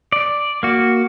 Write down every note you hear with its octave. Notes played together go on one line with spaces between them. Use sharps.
D5
A#3 F#4